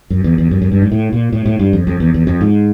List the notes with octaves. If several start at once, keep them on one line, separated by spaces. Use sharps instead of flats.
F#2
E2
E2
F#2
F#2
G2
G#2
A2
A#2
A2
A2
G2
F2
F2
E2
E2
F2
G#2